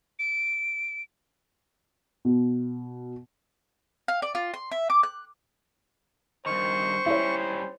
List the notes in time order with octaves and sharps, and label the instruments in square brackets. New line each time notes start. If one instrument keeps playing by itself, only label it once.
[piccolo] D7
[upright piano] B2
[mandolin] F5
D5
F4
C6
E5
D6
F#6
[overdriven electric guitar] G2 D#3 [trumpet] C5 [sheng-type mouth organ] C#6
[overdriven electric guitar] G3 C#4 [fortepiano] E4 C#5